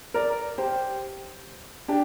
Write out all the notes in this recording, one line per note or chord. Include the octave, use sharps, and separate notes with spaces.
A#4 D5
G4 C5
D4 G4